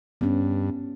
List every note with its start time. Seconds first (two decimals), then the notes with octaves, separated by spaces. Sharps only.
0.21 G2 B3 C#4